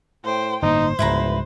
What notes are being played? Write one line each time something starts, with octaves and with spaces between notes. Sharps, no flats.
A2 C5 G5
G1 A2 A#3 D#4 C5
G1 C#2 G#2 E4 B4 A#5